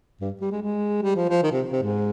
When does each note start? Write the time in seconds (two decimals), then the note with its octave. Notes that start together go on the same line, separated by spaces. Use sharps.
0.21 G2
0.41 G3
0.52 G#3
0.62 G#3
1.02 G3
1.15 F3
1.29 F3
1.43 D#3
1.52 C3
1.72 C3
1.83 G#2